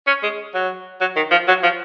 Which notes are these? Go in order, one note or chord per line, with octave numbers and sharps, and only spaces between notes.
C#4
G#3
F#3
F#3
D#3
F3
F#3
F3